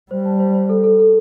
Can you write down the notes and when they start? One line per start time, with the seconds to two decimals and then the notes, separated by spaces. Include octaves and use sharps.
0.11 G3 C5
0.25 A5
0.40 C5
0.55 C5
0.69 A4
0.84 A4
0.99 A4